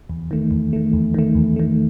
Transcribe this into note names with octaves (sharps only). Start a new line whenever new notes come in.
E2
D#3 A3
E2
D#3 A3
E2
D#3 A3
E2
D#3 A3